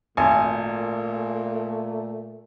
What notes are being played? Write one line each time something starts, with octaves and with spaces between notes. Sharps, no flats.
G#1 A#2 A3 G#5